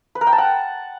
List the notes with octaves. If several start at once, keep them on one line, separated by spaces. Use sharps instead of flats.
B4
A#4
G5
A5
F#5